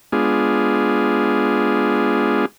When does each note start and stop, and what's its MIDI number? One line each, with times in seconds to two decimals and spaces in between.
0.12 2.45 56
0.12 2.45 59
0.12 2.45 62
0.12 2.45 65
0.12 2.45 68